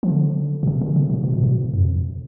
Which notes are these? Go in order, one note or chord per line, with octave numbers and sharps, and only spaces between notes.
F3
D3
B2
C#3
D3
C#3
B2
B2
A2
B2
F#2
F2